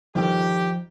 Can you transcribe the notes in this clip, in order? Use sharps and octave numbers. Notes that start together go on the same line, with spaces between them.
G1 D#3 F3 G4 A4